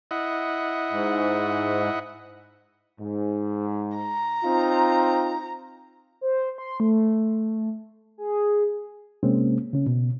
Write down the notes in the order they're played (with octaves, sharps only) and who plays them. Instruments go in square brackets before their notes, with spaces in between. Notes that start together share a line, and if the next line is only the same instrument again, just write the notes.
[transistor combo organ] E4 D#5 F#5
[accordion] G#2
[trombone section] G#2
[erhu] A#5
[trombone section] C4 D#4 F4
[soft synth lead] C5
C6
A3
G#4
[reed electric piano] C3 G#3 A#3 C4 C#4
C#3 C#4
B2